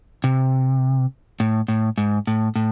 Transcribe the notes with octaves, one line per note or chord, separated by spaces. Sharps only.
C3
A2
A2
G#2
A2
A2